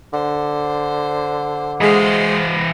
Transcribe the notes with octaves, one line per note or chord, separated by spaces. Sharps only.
D3 C5
E3 G#3 F#4 C5 F5